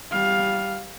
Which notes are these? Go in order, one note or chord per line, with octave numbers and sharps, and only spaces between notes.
G3 F5